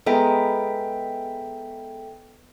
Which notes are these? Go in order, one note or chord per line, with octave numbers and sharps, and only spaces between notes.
G#3 B3 A4 A#4 E5 G5